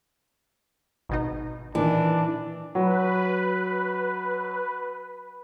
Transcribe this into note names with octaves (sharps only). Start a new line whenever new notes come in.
G#1 B2 D#4
A#2 D#3 E3 D4
F#3 B4